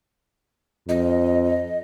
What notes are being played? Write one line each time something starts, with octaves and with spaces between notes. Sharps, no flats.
F2 D#5